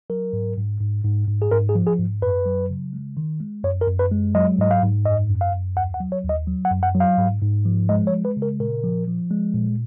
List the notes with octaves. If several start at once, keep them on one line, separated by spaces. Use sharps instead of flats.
F#3 A#4
G#2
G#2
G#2
G#2
G#2
G#4
G#2 A#4
G#4
F3
G#4
G#2
F#2 B4
F#3
C#3
G#3
D#3
G#3
F#2 C#5
A#4
F#2
B4
G#3
F#3 D#5
G#2 D#5
F5
G#2
F#2 D#5
F#2
F5
F#2
D#2 F#5
F#5
F#3
C#5
D#2
D#5
F#3
F#5
F#2
F#5
F#3
F5
G#2
G#2
F3
G#3 D#5
C#5
G#3
B4
C#3
A#4
A#2 A#4
F3
F3
G#3
A#2